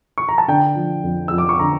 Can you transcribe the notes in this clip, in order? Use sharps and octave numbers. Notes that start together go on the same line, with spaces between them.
C#6
A#5
A5
D3 G5
F3
F2
F2 E6
D6
C#6
D3 A#5